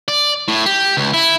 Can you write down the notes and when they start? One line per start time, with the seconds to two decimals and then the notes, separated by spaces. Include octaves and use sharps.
0.08 D5
0.48 A2
0.66 G4
0.97 C#2
1.14 E4